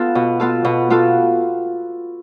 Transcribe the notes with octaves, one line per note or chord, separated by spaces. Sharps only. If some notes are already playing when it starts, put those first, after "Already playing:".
Already playing: B3 F4 A4
B2
B3 F4 A4
B2
B3 F4 A4